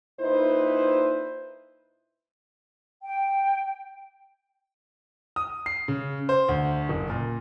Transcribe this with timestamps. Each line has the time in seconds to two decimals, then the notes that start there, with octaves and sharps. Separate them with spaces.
0.20 A#2 D#4 E4 B4 C5
3.04 G5
5.36 D#6
5.66 C7
5.88 C#3
6.29 C5
6.48 D2
6.89 F#1
7.10 A#2